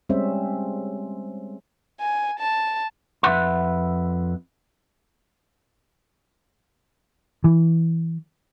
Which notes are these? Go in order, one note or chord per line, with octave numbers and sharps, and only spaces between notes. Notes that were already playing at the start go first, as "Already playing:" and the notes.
G3 G#3 C4 C#4 C5 E5
G#5
A5
F2 C#3 B4 E5 F#5 C6
E3